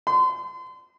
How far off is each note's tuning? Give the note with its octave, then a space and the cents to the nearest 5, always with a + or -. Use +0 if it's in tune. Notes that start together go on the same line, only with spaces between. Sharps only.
C6 -35